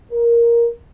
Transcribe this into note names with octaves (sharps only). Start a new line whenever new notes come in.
A#4